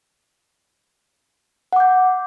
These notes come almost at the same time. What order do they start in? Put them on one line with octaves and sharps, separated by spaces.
F#5 D6 G6